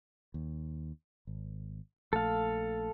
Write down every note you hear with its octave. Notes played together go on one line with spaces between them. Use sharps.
D#2
G#1
A#1 A3 A4 F5